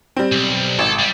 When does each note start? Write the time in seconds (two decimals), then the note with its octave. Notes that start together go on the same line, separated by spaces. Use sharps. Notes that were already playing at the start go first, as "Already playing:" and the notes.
0.17 G3 C4
0.32 B1
0.79 G#1 A4
0.99 G3